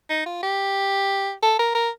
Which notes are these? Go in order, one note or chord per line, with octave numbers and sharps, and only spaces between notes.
D#4
F4
G4
A4
A#4
A#4